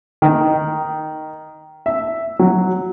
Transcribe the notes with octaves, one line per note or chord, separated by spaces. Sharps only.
D#3
E5
F#3